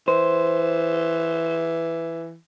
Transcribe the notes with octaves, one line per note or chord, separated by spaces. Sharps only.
E3 C5